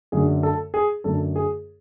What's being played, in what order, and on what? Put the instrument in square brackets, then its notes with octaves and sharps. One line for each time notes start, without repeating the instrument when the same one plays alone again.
[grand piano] F#2 D3 A3 G#4
A4
G#4
F#2 D3 A3 A4
G#4